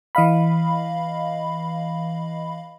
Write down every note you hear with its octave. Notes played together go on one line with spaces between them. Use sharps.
E3 D#5 F5 B5